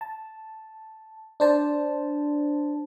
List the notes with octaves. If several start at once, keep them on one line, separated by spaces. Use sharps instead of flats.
A5
D4 C5 A5